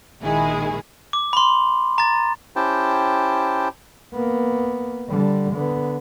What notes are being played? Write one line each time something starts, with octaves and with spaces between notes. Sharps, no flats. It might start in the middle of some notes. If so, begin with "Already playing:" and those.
A#1 D#3 G#3 E4 G#4
D6
B5 C6
A#5 A6
C#4 E4 G4 C5 G5 A5
A#3 B3
D3 G3
D3 B3